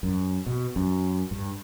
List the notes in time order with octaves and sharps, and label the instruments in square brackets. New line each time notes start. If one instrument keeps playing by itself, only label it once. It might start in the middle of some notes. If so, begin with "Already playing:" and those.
[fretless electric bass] F#2
B2
F#2
G2